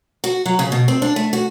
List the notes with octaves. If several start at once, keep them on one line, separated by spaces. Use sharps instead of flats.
F#4
F#3
C#3
B2
C4
D4
A3
F#4